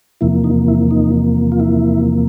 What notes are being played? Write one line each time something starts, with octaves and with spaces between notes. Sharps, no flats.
E2 C3 F3 A#3 E4
D#4
E4
D#4
F4
E4